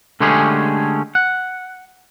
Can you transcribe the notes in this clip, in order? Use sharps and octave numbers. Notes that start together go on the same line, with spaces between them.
D3 G#3 A3 C#4 G4 G#4
F#5